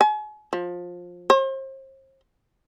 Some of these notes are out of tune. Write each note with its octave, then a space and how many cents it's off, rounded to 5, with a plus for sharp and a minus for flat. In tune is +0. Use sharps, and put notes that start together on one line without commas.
G#5 +40
F3 +20
C5 +40